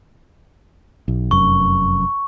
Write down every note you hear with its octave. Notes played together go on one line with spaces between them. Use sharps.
B1
F1 F#2 C#6